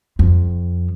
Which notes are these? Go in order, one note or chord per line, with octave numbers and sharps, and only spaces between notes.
F2